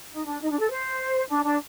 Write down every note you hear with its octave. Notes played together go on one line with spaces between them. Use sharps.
D#4
D4
D#4
D4
A4
C5
D4
D4